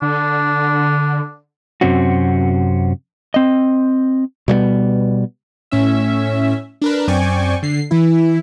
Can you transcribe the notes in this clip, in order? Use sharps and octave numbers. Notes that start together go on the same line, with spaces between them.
D3 D4
F#2 C3 C4 C#4 F#4
C4 D#5
B2 G3 A3 B3
A2 C#4 E5
D4 A#4 B4
F#2 C4 D5 G5 G#5 C#6
D3 C7
E3 E4